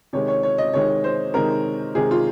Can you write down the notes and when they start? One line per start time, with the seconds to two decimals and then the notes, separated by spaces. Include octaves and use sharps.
0.13 C3 D#3 G#3 C#5
0.28 C#5
0.43 C#5
0.58 D#5
0.74 C3 D#3 G#3 C#5
1.04 C5
1.34 C3 D#3 G#3 A#4
1.95 C3 D#3 G#3 G#4
2.11 F4